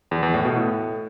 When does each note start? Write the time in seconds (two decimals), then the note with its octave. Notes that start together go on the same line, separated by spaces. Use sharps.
0.11 E2
0.23 E2
0.34 A2
0.45 B2
0.56 A2